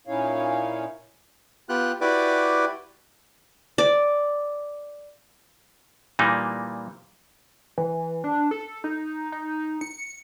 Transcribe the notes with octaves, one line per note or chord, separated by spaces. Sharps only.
A#2 C#4 D#4 E4 C#5 F5
B3 F4 G4 F#6
E4 F#4 G4 B4 D5 D6
D5
A#2 E3 G3 A#3 D#4
E3
D4
A4
D#4
D#4
C#7